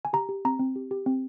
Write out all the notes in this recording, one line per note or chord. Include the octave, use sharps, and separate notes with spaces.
G#5
G4 A#5
G4
C4 A#5
C4
G4
G4
C4